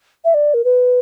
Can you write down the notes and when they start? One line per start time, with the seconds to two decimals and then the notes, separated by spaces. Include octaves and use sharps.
0.25 E5
0.34 D5
0.54 A#4
0.64 B4